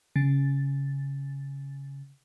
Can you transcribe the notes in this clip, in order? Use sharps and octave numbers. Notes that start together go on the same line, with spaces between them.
C#3 A6